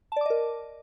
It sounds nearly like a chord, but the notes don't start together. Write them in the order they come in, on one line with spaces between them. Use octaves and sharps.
A5 D5 D6 D#5 A#4